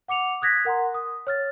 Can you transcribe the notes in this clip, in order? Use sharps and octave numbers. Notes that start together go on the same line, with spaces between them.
F#5 D6 C#7 F7
D#6 F#6 G#6 A#6 B6
A#4 F#5 A#5 C6
D#6
C#5 F6 A6